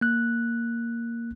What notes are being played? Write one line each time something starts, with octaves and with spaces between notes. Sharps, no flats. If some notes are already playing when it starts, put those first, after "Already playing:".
A#3 F#6